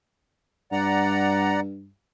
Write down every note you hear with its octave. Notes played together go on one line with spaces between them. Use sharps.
G2 D5 F#5 A#5